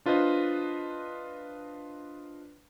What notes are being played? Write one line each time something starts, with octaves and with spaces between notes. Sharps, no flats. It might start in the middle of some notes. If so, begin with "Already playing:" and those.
D4 F4 B4 C5 D#5